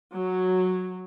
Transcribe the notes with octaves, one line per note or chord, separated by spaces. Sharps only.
F#3